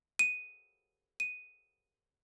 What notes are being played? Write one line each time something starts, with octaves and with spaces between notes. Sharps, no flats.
D#7
D#7